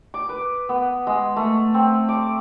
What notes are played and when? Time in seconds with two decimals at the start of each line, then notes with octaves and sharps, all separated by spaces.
0.14 D6
0.29 B4
0.69 B3
1.07 G#3
1.36 A3
1.74 C4
2.09 D6